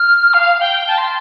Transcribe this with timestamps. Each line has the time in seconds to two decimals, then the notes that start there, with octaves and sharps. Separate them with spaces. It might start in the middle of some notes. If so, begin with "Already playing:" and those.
Already playing: F6
0.34 F5
0.61 G5
0.87 A5
0.98 C6